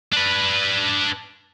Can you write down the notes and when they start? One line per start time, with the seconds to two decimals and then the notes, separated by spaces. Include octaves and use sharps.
0.12 D4 B4